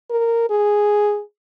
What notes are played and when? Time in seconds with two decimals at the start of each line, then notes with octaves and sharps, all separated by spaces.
0.11 A#4
0.50 G#4